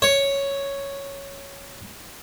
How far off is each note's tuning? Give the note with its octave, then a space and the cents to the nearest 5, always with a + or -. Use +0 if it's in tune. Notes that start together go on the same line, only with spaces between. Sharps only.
C#5 +0